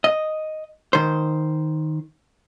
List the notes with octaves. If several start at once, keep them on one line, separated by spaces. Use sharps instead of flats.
D#5
D#3 C5